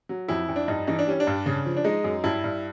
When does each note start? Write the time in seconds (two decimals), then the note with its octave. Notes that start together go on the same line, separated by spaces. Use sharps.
0.09 F#3
0.28 F2 E4
0.49 F2
0.56 D4
0.68 G2 D#4
0.87 E3 D#4
0.99 D4
1.07 G3 C#4
1.20 D4
1.27 G2
1.46 C#3
1.66 F3
1.77 D4
1.84 G#3 D#4
2.04 F#2
2.24 G2 E4
2.44 G2